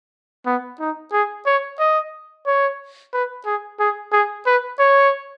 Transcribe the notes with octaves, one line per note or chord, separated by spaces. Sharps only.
B3
D#4
G#4
C#5
D#5
C#5
B4
G#4
G#4
G#4
B4
C#5